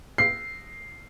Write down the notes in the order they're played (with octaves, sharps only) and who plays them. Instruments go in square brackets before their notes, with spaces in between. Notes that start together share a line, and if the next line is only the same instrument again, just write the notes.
[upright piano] C7